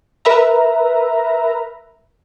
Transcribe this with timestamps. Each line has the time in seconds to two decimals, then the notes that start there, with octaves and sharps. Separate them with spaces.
0.25 A#4 B4 E5 A#5